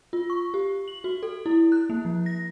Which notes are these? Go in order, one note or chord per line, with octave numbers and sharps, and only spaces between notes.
F4
C#6
G4
F#7
F#4
A4
E4
F#6
A#3
F3
A#6